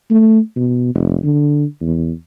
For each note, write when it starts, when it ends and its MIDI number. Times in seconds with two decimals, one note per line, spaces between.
0.10 0.39 57
0.56 0.90 47
0.95 1.17 29
1.23 1.65 50
1.81 2.11 40